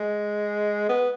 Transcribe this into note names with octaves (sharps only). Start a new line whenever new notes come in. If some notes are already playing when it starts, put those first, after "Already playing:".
Already playing: G#3
B3